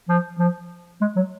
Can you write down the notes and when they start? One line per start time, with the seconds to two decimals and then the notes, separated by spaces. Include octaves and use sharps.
0.09 F3
0.39 F3
1.01 G#3
1.16 F#3